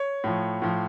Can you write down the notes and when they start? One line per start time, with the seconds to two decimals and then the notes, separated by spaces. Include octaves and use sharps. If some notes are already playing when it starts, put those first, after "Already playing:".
Already playing: C#5
0.24 A2 F3
0.62 A2 F3